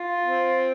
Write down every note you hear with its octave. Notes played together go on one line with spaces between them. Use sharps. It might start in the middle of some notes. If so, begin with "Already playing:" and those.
Already playing: F4
C4